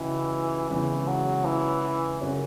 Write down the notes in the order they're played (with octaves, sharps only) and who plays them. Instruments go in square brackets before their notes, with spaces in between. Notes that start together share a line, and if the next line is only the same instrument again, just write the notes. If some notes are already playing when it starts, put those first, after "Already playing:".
Already playing: [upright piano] C#2 C#3 F#4 [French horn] E3
[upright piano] E2 C#3 G#3 [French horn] E3
[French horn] F#3
E3
[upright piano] F#2 C#3 F#3 C#4 F#4